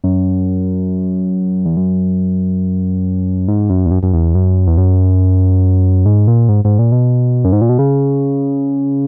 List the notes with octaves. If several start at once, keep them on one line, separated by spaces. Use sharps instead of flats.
F#2
E2
F#2
G#2
F#2
E2
F#2
F#2
E2
F#2
E2
F#2
G#2
A#2
G#2
G#2
A#2
B2
F#2
G#2
A#2
B2
C#3